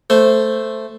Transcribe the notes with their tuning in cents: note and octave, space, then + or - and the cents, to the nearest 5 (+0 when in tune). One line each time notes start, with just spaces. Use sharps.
A3 +0 C5 +0